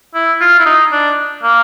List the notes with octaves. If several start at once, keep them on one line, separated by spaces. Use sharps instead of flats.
E4
F4
E4
D#4
D4
A#3